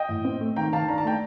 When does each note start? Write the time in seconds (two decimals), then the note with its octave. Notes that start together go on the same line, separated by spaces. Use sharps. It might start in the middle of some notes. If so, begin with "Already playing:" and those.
Already playing: D#5 G5
0.09 A2
0.24 C4
0.40 A3
0.56 D#3 G5 A#5
0.72 D#3 F5 A5
0.88 D4 A#5
0.98 A5
1.05 A3 G5 A#5